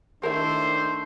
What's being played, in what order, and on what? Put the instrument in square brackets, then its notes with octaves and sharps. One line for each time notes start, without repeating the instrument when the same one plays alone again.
[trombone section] D#3 D4 [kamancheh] A3 [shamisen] E4 A#4 [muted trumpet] C5